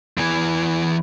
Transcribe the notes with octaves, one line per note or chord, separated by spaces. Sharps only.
E2 E3